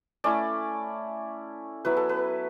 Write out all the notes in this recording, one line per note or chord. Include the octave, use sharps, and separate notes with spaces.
A3 C#4 E4 D5
F#3 B3 E4 B4
A4
B4